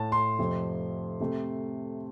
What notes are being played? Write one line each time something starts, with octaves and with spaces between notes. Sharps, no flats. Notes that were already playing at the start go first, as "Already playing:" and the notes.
Already playing: A2 A3 A5
C6
F2 C3 F3 A3
C3 A3